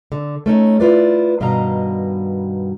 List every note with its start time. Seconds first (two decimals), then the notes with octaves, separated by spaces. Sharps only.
0.12 D3
0.46 A3 C#4 D#4
0.80 E4 F4 B4 D5
1.40 G2 B2 D#3 D#5 F5 A#5